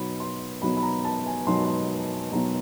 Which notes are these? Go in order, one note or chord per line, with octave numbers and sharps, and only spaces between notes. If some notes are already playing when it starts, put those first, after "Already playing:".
Already playing: B2 F#3 B3 D#4 B5
C6
B2 F#3 B3 D#4 B5
B5
A#5
A5
G#5
B2 F#3 B3 D#4 C6
C6
B2 F#3 B3 D#4 A#5